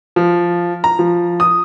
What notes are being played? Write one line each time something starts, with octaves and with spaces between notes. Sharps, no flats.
F3
A#5
F3
D#6